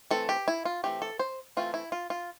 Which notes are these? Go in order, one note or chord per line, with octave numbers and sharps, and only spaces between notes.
E3 A3 C4 A4
G4
E4
F4
E3 A3 C4 G4
A4
C5
E3 A3 C4 F4
E4
F4
F4